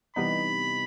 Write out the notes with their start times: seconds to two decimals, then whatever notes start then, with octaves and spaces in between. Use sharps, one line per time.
0.16 C3 E3 G3 B3 D#4 B5